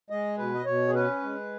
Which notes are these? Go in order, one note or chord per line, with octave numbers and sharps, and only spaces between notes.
G#3 D#5
B2 B4
D#5
B2 C#5
G#4
C#4 B4
G#3